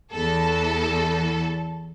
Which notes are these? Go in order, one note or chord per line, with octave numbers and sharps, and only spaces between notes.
E2 A4